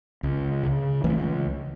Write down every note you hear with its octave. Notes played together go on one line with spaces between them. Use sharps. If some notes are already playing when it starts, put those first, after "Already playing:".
C#2
C#3
C#2 E3 A3